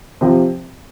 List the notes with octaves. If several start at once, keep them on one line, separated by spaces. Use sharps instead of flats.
C3 F3 C4 G4